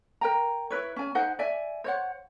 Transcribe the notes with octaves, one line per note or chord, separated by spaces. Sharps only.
A#4 G5 A#5
E4 B4 C#5
C#4 G#5
D#4 C5 F#5 G#5
D5 E5 G#5
C5 C#5 F#5